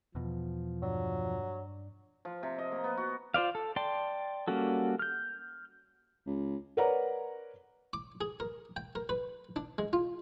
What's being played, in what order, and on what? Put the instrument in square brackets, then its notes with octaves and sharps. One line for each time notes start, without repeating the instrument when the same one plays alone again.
[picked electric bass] E2 B2 [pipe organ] F3
[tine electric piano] G2 D4 D5 [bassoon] F#3
[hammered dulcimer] F3
C3
D#5
A#3
B3
F#4
[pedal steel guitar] F4 C5 D5 F5
A4
D5 G5 A5 C6
G3 A#3 C#4 F#4 A4
F6 G6
[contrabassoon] C#2
[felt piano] A#4 B4 C#5 D5 F#5 A#5
[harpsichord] D6
G#4
A#4
G5
A#4
B4
D4
G#3
F4